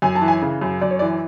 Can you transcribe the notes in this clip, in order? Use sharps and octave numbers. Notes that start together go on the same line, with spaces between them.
F#2 G#5
A5
E3
G#5
C#3
F#2
F#2 D5
C#5
E3 D5